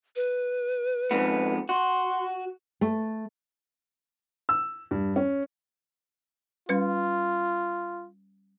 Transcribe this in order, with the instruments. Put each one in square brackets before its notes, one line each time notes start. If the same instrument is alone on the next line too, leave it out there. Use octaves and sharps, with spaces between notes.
[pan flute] B4
[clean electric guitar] F2 G#2 B3
[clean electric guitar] F#4 [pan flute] C6
[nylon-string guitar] A3
[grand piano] E6
G2
C#4
[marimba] G3 C#4 B4 [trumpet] F4